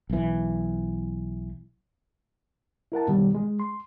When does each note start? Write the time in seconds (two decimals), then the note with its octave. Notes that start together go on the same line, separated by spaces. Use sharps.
0.10 B1 E3
2.92 E4 A#4 F#5 A5
3.07 F#2 B2 D#3 G3
3.35 G#3
3.60 C6